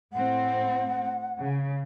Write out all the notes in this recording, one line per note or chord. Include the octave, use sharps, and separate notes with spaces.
A2 C4 F#5
C#3